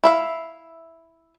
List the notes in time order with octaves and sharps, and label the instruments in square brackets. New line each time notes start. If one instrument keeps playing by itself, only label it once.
[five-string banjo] E4 E5 F5